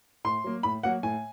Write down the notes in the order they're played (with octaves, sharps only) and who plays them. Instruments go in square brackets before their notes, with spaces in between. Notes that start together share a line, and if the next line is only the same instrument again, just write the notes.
[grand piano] A2 [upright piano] C6
[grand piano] F#3 A#3
[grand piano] A2 [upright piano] B5
[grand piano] F#3 A#3 [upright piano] F#5
[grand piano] A2 [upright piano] G#5